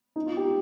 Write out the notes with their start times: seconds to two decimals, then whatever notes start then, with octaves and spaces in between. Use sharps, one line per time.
0.16 D#4
0.26 F4
0.37 G4